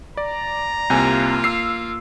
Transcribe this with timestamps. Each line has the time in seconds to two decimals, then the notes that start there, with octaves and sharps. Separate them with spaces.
0.17 D5 A#5
0.90 C2 C3 A#3 F4 G#5
1.44 E6 C7